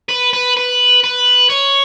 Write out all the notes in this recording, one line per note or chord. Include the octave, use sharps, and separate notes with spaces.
B4
B4
B4
B4
C#5